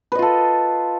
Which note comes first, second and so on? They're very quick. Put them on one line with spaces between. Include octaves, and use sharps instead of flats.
B4 D#5 F4 A4